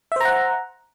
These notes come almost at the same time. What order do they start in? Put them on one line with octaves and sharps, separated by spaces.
E5 C5 A#5 F#5